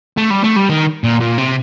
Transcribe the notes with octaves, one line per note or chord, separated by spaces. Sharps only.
A3
G3
A3
G3
D#3
A#2
A#2
C3